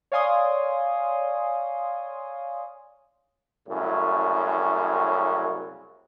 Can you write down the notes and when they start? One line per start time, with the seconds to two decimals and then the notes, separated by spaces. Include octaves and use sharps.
0.12 C#5 D5 F5 G#5 C6 D#6
3.69 C2 F#2 A2 C#3